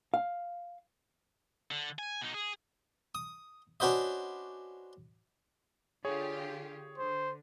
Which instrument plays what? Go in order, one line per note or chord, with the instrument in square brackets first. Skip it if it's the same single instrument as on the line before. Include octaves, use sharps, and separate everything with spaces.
[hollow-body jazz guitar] F5
[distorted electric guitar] D3
G#5
B2 D#4
G#4
[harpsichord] D#6
C#4 D4 F#4 B4 C5 D#5
[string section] D3 F4 G4 [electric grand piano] G#4 C#5
[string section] D3 [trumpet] C5